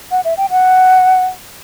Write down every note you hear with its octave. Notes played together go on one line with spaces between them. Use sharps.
F#5
E5
G5
F#5